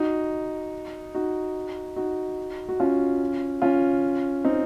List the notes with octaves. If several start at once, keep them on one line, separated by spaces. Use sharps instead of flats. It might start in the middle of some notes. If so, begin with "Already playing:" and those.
Already playing: D#4 F#4
D#4 F#4
D#4 F#4
F#4
C#4 F4
C#4 F4
C4 D#4